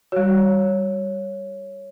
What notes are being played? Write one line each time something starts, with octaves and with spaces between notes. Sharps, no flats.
G3 F#4 C#5